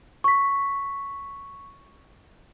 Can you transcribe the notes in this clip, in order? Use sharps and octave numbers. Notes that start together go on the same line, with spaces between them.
C#6 B6